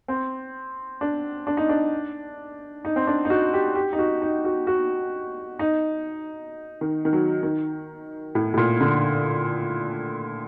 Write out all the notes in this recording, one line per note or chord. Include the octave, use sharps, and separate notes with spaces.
C4
D4
D4
D#4
D4
D#4
C4
D4
D#4
F#4
G4
G4
D#4
F#4
D#4
F#4
F#4
D#4
D#3
D#3
F#3
D#3
A2
A2
A#2
D3